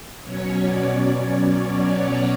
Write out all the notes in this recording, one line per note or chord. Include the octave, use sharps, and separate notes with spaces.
B2 F#3 C#4 C#5
D5
D5